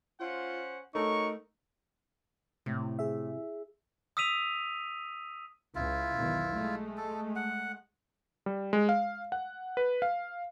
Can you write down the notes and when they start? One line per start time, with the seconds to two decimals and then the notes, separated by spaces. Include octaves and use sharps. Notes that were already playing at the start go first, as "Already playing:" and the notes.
0.20 C#4 F4 C5 F#5
0.95 A3 D#4 F#4 A#4 C#5 C#6
2.66 A2 C3
2.99 G#4 E5
4.17 D#6 E6 B6 D#7 F7
5.75 C#2 C#3 E4 F4
6.15 B1 E2 D#3
6.54 G#3 A3
6.97 A4
7.36 F#5
8.46 G3
8.73 G#3
8.89 F5
9.32 F#5
9.77 B4
10.02 F5